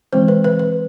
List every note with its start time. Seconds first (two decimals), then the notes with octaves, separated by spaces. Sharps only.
0.13 E3 G#3 C4 C5
0.28 B4
0.44 B4
0.59 B4